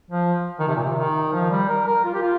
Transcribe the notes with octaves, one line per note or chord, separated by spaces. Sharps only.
F3
D#3
C3
A#2
C3
D#3
F3
G3
A#4
A#4
F4
G4
F4